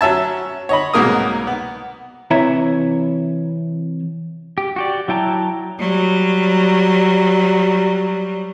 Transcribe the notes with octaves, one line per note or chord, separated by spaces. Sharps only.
F#3 C#4 E5 A5
C#5 D#5 B5
C2 G#2 B2 A#3 A#4 D#6
B3
C3 E3 E4 C#5 E5 A#5
G4
F#4 G4 D5
F#3 E4 G5 A5 A#5
F#3 G3